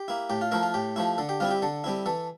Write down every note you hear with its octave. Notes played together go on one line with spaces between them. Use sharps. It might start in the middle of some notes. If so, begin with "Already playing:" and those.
Already playing: G4
A#3 E4
A2 G4
F4
F3 A3 E4 A#4
F4
A2 G4
F3 A3 E4
D3 A4
G4
G3 C4 E4 F4
G4
D3 A4
G3 C4 E4
E3 A4